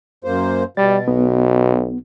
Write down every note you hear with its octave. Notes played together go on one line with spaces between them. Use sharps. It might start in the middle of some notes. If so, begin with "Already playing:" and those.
F#2 A#3 C5
B2 G3 A6
B1 B3